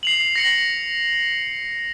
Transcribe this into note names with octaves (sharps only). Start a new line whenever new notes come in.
C7 F7 F#7
A#6 C#7 F#7